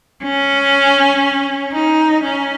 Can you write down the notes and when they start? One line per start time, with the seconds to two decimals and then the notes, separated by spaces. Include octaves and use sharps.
0.23 C#4
1.73 D#4
2.23 C#4